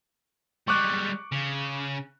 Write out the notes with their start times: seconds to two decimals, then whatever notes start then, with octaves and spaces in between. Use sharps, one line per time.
0.68 G3 G#3 C#6 D6 F#6
1.32 C#3